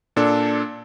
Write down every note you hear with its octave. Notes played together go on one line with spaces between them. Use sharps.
A#2 D4 A4